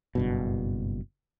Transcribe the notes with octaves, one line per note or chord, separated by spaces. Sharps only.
F#1 G2 B2